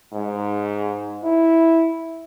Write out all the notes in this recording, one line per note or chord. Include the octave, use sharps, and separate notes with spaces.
G#2
E4